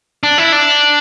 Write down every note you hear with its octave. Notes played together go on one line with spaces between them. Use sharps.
D4
E4
D4